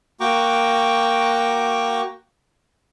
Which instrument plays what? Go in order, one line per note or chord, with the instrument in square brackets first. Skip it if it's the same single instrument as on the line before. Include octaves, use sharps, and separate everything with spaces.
[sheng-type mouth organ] A#3 F#4 G5 A#5 C#6 D6